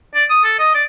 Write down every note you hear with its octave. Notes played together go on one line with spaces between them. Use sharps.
D5
D#6
A4
D#5
D5